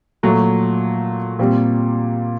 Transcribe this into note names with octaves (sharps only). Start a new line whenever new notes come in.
A#2 F#3 A3
A#2 G3 C4